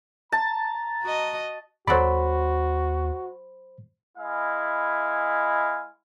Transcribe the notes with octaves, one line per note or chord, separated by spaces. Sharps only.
A5 A#5
F#4 D#5
D#2 F#3 F#4 A4 C5 D5 B5
G#3 E4 D#5 F5 G#5 B5